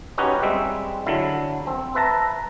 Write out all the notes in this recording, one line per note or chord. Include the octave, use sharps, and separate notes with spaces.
C#4 D#4 F#4 G4 B4 C#5
G3 G#3 C4 E5
D3 F#3 E4
C4
B4 E5 A5 A#5